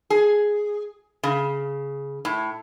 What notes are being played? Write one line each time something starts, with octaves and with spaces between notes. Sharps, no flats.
G#4
C#3
A2